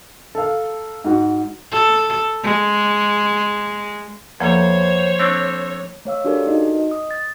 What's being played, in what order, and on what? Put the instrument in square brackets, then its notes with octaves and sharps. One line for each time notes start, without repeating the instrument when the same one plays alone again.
[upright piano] A4 A#4 F5
G#2 F#4
[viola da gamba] A4
G#3
[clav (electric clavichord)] E2 [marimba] F3 A#3 A4 [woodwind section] C5 [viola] C#5
[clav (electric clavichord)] A3 C4 D4
[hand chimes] A3 C#5 F5 E6
D4 F#4 G4 A4 A#4 D5
D#4 F#4 D#5
D#5
D#6
A6